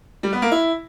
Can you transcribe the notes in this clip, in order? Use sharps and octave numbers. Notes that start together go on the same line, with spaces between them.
G3
B3
A#3
E4